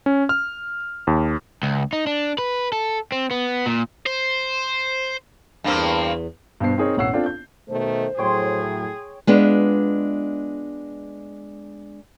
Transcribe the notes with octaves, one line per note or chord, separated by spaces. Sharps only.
C#4
F6
D#2
C#2
D#4
D4
B4
A4
C4
B3
A#2
C5
E2 G2 A#3 C4
G2 B2 C5 C7
C4 D#4 G#4 A#4 C#5
E1 A1 C#5 F#5 E6 C7
C4 D4 F4 A4
G6
B2 D#3 A3 C5
A2 F#3 G#4 C#5 G5 C6
G#3 B3 D4 F4